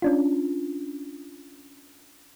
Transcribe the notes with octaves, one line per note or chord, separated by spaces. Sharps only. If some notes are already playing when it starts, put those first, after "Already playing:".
C#4 D4 F4